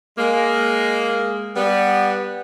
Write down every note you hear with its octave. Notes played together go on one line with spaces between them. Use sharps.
G#3 A#3
G3 B3